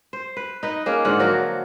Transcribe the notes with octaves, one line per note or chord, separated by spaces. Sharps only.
C5
B4
D#4 B4
A#3 C#4 D#4 G#4
G#2 D3 F4 F#5
F3 F#3 F#4 A#4